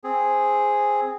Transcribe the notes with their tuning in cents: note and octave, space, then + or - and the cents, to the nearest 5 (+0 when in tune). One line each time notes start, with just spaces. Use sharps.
C4 +0 G#4 +0